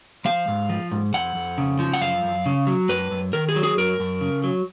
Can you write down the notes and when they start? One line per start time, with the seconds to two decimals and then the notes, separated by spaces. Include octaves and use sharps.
0.25 F3 F5
0.48 G#2
0.70 F3
0.92 G#2
1.14 F2 F#5
1.35 F2
1.58 C#3
1.79 F3
1.93 F#5
2.01 F#2 F5
2.24 F#2
2.46 C#3
2.67 F#3
2.89 F#2 B4
3.11 F#2
3.33 D#3 A#4
3.49 G#4
3.56 F#3
3.63 G#4
3.77 F#2 A#4
4.00 F#2
4.21 C#3
4.44 F#3